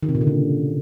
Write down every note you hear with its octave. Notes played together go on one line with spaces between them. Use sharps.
D#3
C3
A#2
D3
C#3